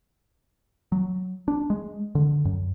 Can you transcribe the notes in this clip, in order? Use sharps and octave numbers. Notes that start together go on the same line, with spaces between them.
F#3
D4
G#3
D3
F#2